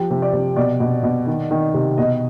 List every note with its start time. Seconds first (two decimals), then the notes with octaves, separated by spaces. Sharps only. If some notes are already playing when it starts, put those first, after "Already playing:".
Already playing: F3 G4
0.10 C3
0.22 D5
0.33 C3
0.56 B2 D5
0.80 B2
1.03 B2
1.27 D#3
1.51 D#3
1.74 C3
1.98 B2 D#5